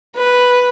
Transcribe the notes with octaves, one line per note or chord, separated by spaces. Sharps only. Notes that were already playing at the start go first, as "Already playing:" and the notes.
B4